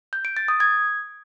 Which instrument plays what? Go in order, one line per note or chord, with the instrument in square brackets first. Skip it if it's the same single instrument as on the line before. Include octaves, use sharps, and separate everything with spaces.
[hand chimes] G6
D7
A6
D#6
G#6